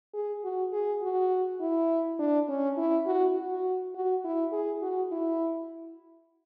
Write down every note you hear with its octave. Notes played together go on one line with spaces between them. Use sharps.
G#4
F#4
G#4
F#4
E4
D4
C#4
E4
F#4
F#4
F#4
E4
G#4
F#4
E4